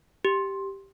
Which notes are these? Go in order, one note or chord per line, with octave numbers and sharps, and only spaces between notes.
G4